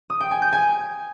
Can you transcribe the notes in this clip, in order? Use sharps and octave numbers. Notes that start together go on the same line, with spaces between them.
D#6
G5
G#5
G6
G#5